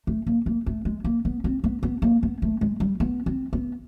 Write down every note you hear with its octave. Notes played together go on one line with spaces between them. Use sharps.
A3
A#3
A#3
A3
G#3
A#3
B3
C4
B3
B3
A#3
B3
A3
G#3
G3
B3
C4
B3